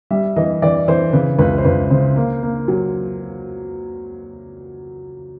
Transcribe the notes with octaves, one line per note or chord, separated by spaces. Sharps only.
G3 E5
E3 D#5
E3 D5
E3 C5
C#3 B4
C#2 B4
C5
C#2 B4
C#3 C5
A#3
A#3
F#3